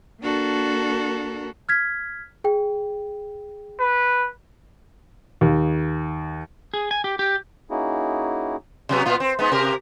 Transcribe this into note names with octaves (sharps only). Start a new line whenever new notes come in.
A#3 D4 F#4 A4 A#4
F6 G#6 B6
G#4 G5
B4
D#2
G#4
G#5
G4
G4
A#3 C#4 D#4 E4 F#4 G#4
C3 F#3 B3
A#2 B3 F4
C4
G#3 B3 D#4
C3 G4 A#4